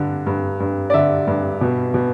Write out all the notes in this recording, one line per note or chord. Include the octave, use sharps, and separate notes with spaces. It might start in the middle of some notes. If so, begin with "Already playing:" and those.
Already playing: G2 D3
G2
G2
D5
D3 E5
G2
B2
B2